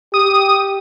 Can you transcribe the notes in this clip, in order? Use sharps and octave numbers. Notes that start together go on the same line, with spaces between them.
G4 D#6